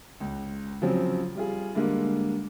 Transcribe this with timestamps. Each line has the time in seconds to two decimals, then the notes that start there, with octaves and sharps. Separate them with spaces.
0.20 C#2
0.82 C#3 F3 F#3 C4
1.36 G3 F4 G#4
1.75 D3 G3 G#3 A#3